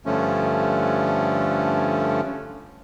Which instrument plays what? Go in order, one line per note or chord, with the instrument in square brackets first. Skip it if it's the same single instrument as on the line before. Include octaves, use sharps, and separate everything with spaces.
[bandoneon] G2 D3 F3 A3 C#4